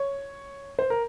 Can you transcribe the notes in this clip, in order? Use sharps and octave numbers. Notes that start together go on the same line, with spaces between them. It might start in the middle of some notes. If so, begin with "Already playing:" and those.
Already playing: C#5
C5
A#4